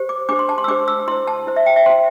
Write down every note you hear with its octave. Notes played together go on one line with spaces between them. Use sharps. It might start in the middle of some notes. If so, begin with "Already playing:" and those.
Already playing: G4 C5
D6
D4 G4 C5 D6
C6
A5
C6
E6
D4 G4 C5 D6
E6
E4 C5 C6
A5
E4 C5
E5
G5
E5
E4 C5 C6